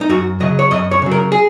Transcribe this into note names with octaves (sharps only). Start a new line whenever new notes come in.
D#4
F#2 F#4
C#3 F#3 D#5
C#5
F#2 D#5
C#5
C#3 F#3
A#4
G#4